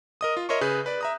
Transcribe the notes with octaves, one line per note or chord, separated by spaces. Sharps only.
A#4 D#5 D#6
F4
A#4 C#5 D#5 E5 C6 C#6
C#3 G#4 B4 F#6 G6
B4 D5
E5 A#5 D#6